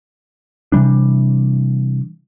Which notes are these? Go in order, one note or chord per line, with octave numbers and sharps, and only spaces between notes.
C3 E3 G3 D4